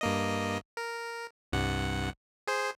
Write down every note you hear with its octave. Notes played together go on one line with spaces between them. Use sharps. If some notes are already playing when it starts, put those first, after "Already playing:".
G2 A#3 D#5
A#4
C2 G2 F#5
G#4 C5